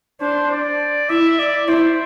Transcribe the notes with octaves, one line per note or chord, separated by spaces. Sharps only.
D4 C5
D5
E4 E5
D5
E4 C5